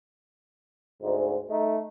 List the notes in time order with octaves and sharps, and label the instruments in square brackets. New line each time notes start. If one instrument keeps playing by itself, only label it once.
[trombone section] D2 G#2
A3 D#4